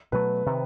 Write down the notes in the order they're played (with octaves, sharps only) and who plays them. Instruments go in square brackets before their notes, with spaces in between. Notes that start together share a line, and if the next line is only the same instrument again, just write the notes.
[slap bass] B2 F#3 A3 [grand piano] B4
[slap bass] C3 D#3